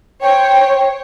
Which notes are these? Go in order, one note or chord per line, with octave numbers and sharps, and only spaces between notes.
C5 C#5 G5